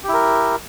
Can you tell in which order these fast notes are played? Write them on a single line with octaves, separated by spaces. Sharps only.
G4 E4 A#4